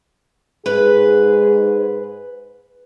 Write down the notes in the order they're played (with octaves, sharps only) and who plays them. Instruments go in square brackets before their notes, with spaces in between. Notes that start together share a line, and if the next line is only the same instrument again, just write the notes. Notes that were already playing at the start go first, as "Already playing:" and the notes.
[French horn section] G#2 G#4 [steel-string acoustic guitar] B4